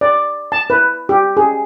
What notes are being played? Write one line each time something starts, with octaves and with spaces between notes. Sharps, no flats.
D5
A5
B4
G4
G#4